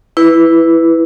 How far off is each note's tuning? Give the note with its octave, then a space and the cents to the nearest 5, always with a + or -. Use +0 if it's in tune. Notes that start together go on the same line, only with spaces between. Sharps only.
E4 +0 B4 +0